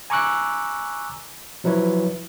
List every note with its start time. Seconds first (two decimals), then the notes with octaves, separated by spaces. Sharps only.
0.10 G#5 A#5 C#6 D6 E6 F#6
1.64 F3 F#3 E4 B4 C#5